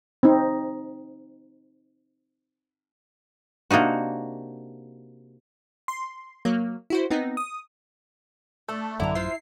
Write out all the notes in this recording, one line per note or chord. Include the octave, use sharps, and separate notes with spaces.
C4 D#4
C3 A#3 D4 D#4 F#4
C6
F#3 A#3
E4 F#4 C5
B3 C4 D#4
D#6
A3 D4 A4
A1 F#2 D3 F#3 B3 E4 A#5
F4 C5 E5 C7